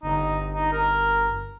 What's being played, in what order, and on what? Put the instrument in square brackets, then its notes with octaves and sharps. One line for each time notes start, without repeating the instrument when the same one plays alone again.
[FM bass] G1 [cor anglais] D#4
[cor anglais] D#4
A#4